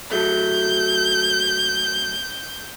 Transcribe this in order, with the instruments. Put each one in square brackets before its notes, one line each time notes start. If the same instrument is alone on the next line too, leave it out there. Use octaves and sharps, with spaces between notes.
[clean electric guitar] F#3 A3 [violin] G6